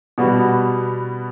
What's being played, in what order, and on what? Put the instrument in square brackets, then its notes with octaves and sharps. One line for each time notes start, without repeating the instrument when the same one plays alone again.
[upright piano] B2 G3 B3 F#4